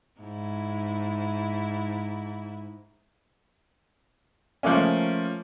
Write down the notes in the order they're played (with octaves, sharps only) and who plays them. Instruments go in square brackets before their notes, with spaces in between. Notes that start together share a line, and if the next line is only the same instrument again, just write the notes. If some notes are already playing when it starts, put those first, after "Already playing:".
[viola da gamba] G#2 E4
[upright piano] F3 A3 A#3 C#4